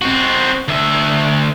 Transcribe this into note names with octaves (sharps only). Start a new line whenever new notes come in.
C4 F#4
D2 E5